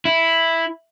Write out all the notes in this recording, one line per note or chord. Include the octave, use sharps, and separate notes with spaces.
E4